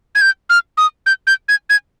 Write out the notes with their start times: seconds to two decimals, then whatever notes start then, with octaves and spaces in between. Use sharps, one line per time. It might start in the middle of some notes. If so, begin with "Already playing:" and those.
0.15 G#6
0.21 G6
0.50 F6
0.77 D#6
1.06 G6
1.27 G6
1.49 G#6
1.70 G#6